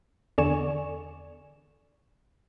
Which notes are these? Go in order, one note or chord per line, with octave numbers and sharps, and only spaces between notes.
E2 D3 D5 G#5 C#6 E7